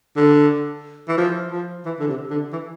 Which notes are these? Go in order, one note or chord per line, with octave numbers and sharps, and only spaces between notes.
D3
E3
F3
F3
E3
D3
C3
D3
E3